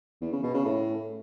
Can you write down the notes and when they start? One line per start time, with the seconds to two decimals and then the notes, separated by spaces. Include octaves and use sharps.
0.21 E2
0.32 C#3
0.43 B2
0.54 C#3
0.65 A2